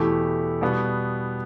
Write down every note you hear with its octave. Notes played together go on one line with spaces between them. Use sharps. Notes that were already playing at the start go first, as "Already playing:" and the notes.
Already playing: E2 B2 A3 E4 G4
B2 G3 B3